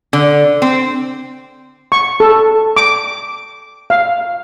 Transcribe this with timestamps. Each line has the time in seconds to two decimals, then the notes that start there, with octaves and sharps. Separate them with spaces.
0.13 D3
0.62 C4
1.92 C#6
2.20 A4
2.77 D6
3.90 F5